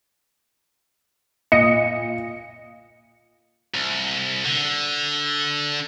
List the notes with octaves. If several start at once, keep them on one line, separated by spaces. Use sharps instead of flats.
A#2 D#5 C#7
C2
D3